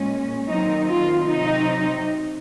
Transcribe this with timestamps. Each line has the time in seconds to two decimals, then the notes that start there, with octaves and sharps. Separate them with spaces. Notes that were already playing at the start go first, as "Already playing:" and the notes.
Already playing: A#2 G#3 C#4
0.46 D#3 F#3 C4 D#4
0.87 F4
1.28 C3 F#3 C4 D#4